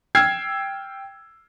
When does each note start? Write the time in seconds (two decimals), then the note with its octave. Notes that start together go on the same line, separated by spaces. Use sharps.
0.15 G5 E6 F6 G#6 C7